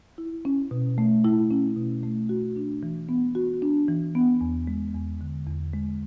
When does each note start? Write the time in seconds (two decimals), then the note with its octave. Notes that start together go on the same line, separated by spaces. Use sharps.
0.18 E4
0.45 C#4
0.71 B2
0.98 A3
1.24 E4
1.51 C#4
1.76 B2
2.03 A3
2.29 F#4
2.56 D4
2.83 E3
3.09 B3
3.35 F#4
3.62 D4
3.88 E3
4.15 B3
4.41 E2
4.67 G#3
4.95 E2
5.21 D3
5.47 E2
5.73 G#3